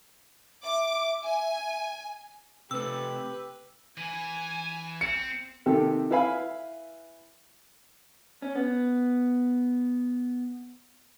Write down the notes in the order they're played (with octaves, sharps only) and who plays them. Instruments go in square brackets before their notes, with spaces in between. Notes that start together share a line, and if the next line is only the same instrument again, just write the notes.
[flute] E5 [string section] D6
[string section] G#5
[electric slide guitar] C3 A3 [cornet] G4 [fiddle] B4 [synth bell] E6
[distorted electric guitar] E3 [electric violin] G#5
[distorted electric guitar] C4 [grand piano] C#7
[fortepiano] C3 D#3 C4 G4 A4
E4 B4 E5 F5 G#5 B5
[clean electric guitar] C#4
B3